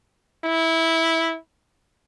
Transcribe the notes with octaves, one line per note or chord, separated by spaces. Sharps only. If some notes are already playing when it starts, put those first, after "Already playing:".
E4